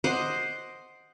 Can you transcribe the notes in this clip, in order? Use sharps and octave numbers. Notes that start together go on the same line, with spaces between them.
C5 D#5 F#5 D6